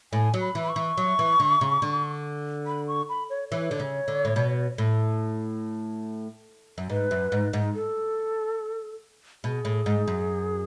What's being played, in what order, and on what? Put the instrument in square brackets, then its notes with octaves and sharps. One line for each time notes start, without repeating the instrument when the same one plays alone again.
[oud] A2 [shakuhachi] G#5
[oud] F#3
[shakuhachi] B5
[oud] E3
[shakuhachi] B5
C#6
[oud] E3
F#3
E3
D3
C#3
D3
[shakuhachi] B5
C#6
B5
C#5
[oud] E3 [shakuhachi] C#5
[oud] D3
C#3
D3
A2
B2
A2
F#2
[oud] G#2 [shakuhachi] B4
[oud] F#2
G#2
G#2
[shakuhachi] A4
[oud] B2 [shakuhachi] G#4
[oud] A2
G#2
F#2